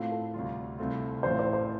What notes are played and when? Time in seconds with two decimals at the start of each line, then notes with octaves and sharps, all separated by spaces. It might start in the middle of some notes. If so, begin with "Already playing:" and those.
Already playing: A2 A3 C4 F4
0.12 A4
0.34 D2 C3 G3 F4
0.78 C2 C3 A3 C4 F4
1.23 A1 A2 A3 C4 F4 C5
1.39 C5
1.53 C5